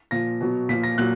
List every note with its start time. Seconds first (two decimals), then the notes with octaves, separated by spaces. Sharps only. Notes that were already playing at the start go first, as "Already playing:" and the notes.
0.11 A#2 F3 A#6
0.41 B2 F#3
0.69 A#2 F3 B6
0.83 A#6
0.98 A#2 F#3 F#6